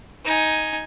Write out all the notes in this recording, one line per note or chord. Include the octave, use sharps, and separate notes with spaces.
D#4 G#5